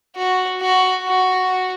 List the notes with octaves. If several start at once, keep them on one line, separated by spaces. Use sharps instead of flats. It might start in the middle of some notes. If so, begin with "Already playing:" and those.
F#4
F#4
F#4